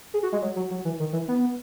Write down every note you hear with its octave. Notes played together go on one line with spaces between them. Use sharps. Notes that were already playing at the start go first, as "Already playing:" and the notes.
G#4
F#4
G#3
F#3
F#3
F#3
E3
D#3
E3
B3